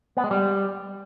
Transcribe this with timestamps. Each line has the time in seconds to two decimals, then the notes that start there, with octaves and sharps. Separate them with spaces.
0.17 B3
0.24 G#3
0.31 G3